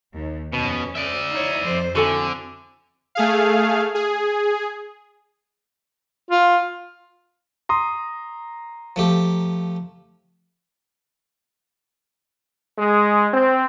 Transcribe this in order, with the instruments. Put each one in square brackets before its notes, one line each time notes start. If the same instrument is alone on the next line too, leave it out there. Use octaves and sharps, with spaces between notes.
[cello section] D#2
[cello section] F2 C#4 [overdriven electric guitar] B2
[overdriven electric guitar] D5 E5
[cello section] D#4 E4 C#5
F2 C5
[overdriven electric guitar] D3 [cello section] C4 E4 [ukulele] F#4 A4 G#5
[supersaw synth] A3 G#4 F5
G#4
[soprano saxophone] F4
[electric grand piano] A#5 C6 D#6
[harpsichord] F3 A3 G4
[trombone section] G#3
C4